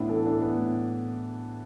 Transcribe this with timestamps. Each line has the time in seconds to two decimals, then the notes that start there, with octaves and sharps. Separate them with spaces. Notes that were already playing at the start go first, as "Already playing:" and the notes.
Already playing: A2 B3 D4 E4
0.09 E3 A4
0.26 D4 A4
0.42 B3
0.58 A2